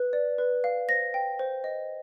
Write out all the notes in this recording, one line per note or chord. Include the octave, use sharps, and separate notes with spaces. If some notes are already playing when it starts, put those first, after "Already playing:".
Already playing: B4
D5
B4
F5
C5 A#6
G5
C5
D#5